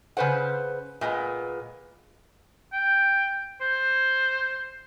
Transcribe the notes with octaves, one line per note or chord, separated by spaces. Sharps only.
C#3 C#4 B4 C5 F#5
A#2 G#3 A3 B3
G5
C5